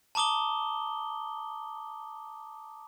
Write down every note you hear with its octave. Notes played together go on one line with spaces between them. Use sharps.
A5 A#5 D6 D#6 G7